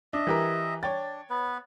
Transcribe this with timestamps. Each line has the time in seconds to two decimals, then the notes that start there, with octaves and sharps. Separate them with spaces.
0.13 D4 D#5 E5
0.27 E3 G4 A#4
0.83 D4 C#5 G5 A6
1.30 B3 B4